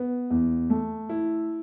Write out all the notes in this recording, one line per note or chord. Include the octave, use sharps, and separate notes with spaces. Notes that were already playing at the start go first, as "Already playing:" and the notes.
Already playing: B3
E2
A3
E4